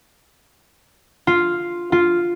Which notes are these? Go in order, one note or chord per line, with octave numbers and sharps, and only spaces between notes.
F4
F4